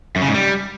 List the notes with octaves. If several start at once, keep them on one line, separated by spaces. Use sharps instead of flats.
F#2
C#3
G#2
G3